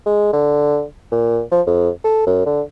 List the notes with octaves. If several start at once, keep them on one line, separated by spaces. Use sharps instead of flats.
G#3
D3
A#2
F3
F2
A4
F#2
D3